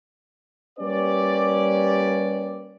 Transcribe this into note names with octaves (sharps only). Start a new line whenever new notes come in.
G3 A#3 C#4 G4 B4 D5